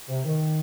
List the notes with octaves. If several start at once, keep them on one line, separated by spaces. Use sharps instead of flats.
C3
D#3